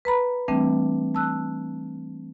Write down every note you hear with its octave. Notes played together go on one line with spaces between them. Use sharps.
B4 A#5 B5
E3 G3 A3 C4 D4
A5 E6 F#6